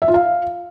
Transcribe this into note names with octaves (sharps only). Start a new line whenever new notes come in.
E5
F4
F5